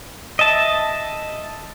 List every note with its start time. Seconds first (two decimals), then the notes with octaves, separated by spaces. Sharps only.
0.39 D#5 E5 A5